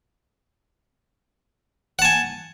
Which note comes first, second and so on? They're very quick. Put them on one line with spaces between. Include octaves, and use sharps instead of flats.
F#5 A5 G#5